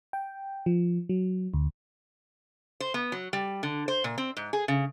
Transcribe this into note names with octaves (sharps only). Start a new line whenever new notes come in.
G5
F3
F#3
D2
C5
B3
F#3
G3
D3
C5
A#2
C4
G#2
G#4
C#3